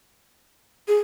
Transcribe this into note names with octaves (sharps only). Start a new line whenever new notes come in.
G#4